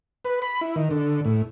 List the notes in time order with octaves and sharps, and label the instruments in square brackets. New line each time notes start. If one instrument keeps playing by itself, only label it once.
[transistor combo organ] B4
B5
E4
D#3
D3
A2